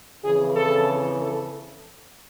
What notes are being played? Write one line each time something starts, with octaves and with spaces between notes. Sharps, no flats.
F2 C#3 E3 G#4
A4
A4